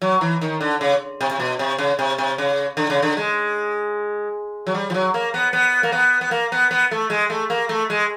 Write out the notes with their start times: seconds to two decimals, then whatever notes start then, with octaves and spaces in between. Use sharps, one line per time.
0.02 F#3
0.21 E3
0.41 D#3
0.61 D3
0.81 C#3
1.21 C3
1.31 C3
1.40 B2
1.59 C3
1.78 C#3
1.99 C3
2.18 C3
2.38 C#3
2.77 D3
2.90 C#3
3.03 D3
3.17 G#3
4.67 F#3
4.74 G3
4.90 F3
4.94 F#3
5.14 A#3
5.34 B3
5.53 B3
5.83 A#3
5.92 B3
6.21 B3
6.31 A#3
6.52 B3
6.71 B3
6.91 A3
7.10 G#3
7.30 A3
7.50 A#3
7.69 A3
7.90 G#3